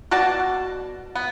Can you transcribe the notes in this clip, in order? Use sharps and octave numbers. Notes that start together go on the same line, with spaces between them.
B2 F#4 D5 A5
B3